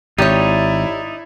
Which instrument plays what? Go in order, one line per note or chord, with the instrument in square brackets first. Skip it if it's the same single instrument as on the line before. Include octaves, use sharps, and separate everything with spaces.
[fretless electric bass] G#1 [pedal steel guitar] D#4 D5 D#6 [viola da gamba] E4 [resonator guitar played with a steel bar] G4 C#5